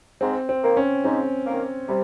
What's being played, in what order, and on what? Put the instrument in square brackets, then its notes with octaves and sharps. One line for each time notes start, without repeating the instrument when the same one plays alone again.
[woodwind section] G#2 [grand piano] C4
[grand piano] C4
[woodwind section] D#3 A#3
[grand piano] C#4
[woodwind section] G#2 [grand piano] C4
[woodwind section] D#3 A#3
[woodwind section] C3 [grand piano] G3